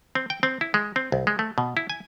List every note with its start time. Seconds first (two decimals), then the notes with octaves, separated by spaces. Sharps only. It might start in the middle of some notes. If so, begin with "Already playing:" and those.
0.15 C4
0.30 G5
0.43 C4
0.61 E4
0.74 G#3
0.96 C4
1.12 C2
1.27 G#3
1.39 A3
1.58 B2
1.77 E4
1.90 G#5